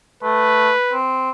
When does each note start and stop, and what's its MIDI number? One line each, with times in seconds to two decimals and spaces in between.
0.23 0.71 57
0.23 0.97 71
0.92 1.31 60